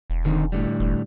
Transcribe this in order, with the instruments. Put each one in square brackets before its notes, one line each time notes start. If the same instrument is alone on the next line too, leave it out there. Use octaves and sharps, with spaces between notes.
[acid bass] E1
[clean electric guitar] D3 D#3 C4
A2 D3 G3
[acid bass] E1